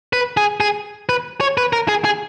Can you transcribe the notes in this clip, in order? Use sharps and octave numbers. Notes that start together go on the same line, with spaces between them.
B4
G#4
G#4
B4
C#5
B4
A#4
G#4
G#4